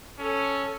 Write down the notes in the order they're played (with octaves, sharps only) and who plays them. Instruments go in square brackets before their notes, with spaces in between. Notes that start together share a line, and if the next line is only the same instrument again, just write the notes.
[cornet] C#4 [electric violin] A4